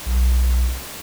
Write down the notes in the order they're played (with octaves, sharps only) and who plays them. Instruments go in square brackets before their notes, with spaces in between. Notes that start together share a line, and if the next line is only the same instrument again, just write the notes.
[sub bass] B1